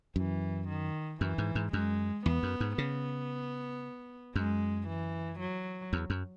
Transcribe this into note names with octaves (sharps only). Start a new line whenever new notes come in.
F#2 E3
D#3
F#2 E3
G#2
G#2
F#2 G#3
E2 B3
F#2
G#2
C#3 B3
F#2 G#3
E3
F#3
E2
F#2